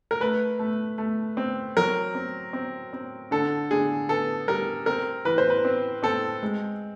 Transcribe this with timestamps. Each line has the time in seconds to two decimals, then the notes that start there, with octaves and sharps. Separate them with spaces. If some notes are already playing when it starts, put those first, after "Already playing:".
0.11 A#4
0.20 A3 B4
0.59 A3
0.98 A3
1.37 C4
1.77 F#3 A#4
2.15 C4
2.53 C4
2.93 C4
3.31 D3 A4
3.71 D3 G#4
4.09 B3 A4
4.48 G3 A#4
4.86 C4 A#4
5.25 E3 B4
5.38 C5
5.50 B4
5.65 C4
6.03 C4 A4
6.43 G#3